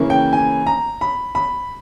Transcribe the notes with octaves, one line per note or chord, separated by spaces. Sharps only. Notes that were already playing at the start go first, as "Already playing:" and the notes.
Already playing: C#3 E3 A#3 C#4 E4
G5
G#5
A#5
B5
B5